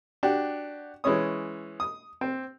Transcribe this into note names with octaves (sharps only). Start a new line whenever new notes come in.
D4 F#4 G4
E3 G#3 C#4 C#5 D#6
D#6
C4